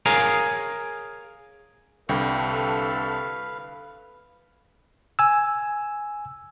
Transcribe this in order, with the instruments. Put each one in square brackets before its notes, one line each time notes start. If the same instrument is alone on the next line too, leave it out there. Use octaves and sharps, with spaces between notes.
[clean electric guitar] G#4 A#4 C#5 F5 G#5 A#5
[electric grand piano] C2 D3 G5 [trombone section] A4 [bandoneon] B4 F5
[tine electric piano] G#5 E6